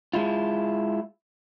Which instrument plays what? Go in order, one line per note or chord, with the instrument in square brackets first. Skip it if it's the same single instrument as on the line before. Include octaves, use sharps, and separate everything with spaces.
[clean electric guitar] G#3 E4 F4